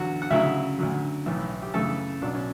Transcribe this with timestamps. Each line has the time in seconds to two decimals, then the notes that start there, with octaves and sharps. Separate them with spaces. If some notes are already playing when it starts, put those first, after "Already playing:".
Already playing: E2 D3 F#3 F#4 F#5
0.22 F#5
0.30 D2 C#3 F#3 E4 E5
0.78 D2 D3 F#3
1.26 B1 A2 E3
1.62 G4
1.74 F#2 C#3 E3 A3 A4
2.22 B1 B2 F#3 D4
2.35 C#4